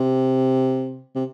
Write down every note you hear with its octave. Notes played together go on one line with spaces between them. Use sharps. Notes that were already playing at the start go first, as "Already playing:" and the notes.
Already playing: C3
C3